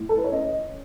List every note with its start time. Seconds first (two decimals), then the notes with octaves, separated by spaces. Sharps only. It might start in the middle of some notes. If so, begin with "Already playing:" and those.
Already playing: A2
0.09 A4
0.17 B4
0.24 C#5
0.32 C#4 D#5